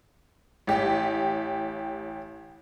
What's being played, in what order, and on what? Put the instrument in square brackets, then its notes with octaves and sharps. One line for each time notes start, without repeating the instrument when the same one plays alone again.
[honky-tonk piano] A1 G4